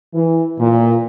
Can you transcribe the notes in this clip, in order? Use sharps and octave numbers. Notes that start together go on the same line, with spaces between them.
E3
A#2